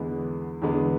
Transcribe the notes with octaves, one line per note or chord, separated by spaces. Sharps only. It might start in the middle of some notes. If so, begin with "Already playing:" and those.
Already playing: E2 D3 G#3 B3
E2 D3 G#3 B3